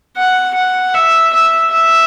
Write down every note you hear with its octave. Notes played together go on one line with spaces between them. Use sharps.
F#5
F#5
E5
E5
E5